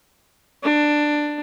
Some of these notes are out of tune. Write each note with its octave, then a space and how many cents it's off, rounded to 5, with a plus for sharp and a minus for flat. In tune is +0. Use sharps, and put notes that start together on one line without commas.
D4 +10